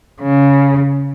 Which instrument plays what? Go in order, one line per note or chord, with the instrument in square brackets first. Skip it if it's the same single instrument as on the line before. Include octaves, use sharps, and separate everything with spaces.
[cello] C#3